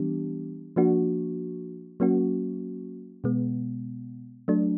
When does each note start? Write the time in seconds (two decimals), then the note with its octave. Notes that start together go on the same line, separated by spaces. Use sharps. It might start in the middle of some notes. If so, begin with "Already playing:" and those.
Already playing: E3 G3 B3 D4 G4
0.76 F3 A#3 D4 F#4
2.00 F#3 A#3 C#4 F#4
3.24 B2 G#3 B3
4.48 F#3 A3 D4